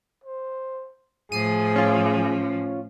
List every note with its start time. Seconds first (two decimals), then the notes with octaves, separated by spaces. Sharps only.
0.24 C5
1.32 A2 F3 G#4 C7 D#7
1.76 C#4 F4